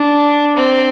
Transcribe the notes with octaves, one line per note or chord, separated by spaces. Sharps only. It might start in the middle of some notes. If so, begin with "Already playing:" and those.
Already playing: D4
C4